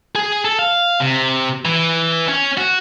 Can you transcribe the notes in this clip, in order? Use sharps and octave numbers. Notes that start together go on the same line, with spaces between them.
G#4
A4
F5
C3
E3
C#4
F#4